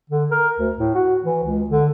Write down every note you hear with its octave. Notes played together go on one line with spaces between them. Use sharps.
D3
A#4
D2
A2
F#4
E3
C#2
D3